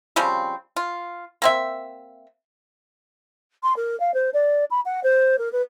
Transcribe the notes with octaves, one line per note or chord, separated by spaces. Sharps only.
C#3 F3 G3 C4
F4
A#3 C4 E5
C6
A#4
F5
C5
D5
B5
F#5
C5
A#4
B4